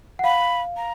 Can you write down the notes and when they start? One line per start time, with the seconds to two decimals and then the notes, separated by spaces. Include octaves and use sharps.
0.19 F#5
0.24 F5 B5
0.77 A#5